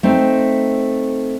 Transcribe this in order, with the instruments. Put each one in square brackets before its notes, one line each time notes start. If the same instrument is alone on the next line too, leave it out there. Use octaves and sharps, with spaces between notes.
[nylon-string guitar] A3 C4 D#4